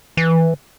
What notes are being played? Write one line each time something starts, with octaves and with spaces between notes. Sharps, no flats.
E3